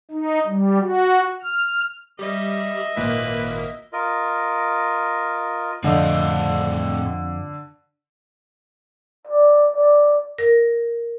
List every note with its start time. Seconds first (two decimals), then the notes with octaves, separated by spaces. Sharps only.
0.11 D#4
0.46 G3
0.81 F#4
1.43 F6
2.19 G3 D#5 E5
2.97 G#1 A#2 A#3 B4 B6
3.93 F4 A#4 D#5
5.84 F2 A2 D3 C4 C5 D#5
9.27 D5
9.75 D5
10.38 A#4